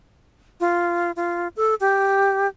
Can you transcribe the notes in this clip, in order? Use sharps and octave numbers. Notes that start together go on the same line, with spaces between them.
F4
F4
A4
G4